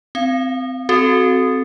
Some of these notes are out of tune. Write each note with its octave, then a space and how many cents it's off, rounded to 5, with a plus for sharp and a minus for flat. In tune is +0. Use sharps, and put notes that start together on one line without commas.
C4 -20 F5 -30
C4 +0 F#4 +10 A4 -15